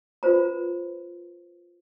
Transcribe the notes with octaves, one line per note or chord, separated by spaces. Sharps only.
F4 B4 C5 A#5